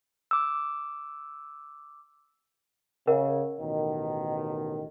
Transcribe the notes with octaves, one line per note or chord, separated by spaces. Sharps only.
D6 E6
C#3 A#4 D#5 F#5
A1 B2 D#3